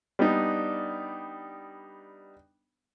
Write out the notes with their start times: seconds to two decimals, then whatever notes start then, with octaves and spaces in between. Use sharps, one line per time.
0.19 G3 B3 D4 D#4